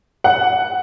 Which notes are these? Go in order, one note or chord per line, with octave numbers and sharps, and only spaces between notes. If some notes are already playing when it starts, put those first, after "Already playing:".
F#5